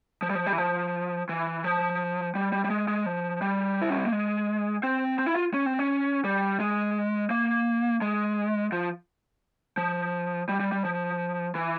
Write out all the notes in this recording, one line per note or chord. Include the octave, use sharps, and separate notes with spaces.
F3
G3
F3
G3
E3
F3
E3
F3
G3
G3
G3
G#3
G#3
F3
G3
E4
C#4
C4
A#3
G#3
C4
C4
E4
F4
C#4
C4
C#4
G3
G#3
A#3
G#3
F3
F3
G3
G3
G3
F3
E3